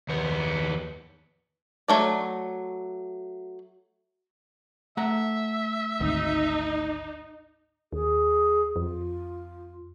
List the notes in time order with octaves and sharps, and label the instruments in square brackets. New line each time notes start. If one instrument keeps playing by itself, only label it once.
[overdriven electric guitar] D#2 B3
[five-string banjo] F#3 A3 D5
[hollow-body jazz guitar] A3 F#5 A#5 [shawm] E5
[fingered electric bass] G#1 D2 [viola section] D#4
[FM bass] D#2 [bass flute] G#4
[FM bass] F2 [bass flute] F4